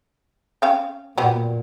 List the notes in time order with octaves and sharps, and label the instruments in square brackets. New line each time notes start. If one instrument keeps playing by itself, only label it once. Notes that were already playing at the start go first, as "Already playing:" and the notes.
[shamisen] C#4 F5 G5
[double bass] A#2 [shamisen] F#3 G3 B3